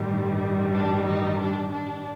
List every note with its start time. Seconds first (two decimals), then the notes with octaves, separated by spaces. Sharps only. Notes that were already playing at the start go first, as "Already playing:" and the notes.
Already playing: A1 G2 D#3 G3
0.75 D4
1.07 D#4
1.40 D4
1.72 D4